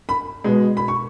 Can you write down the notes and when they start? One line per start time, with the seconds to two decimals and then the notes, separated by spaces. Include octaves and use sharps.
0.09 B5
0.44 B2 G#3
0.77 B5
0.88 C#6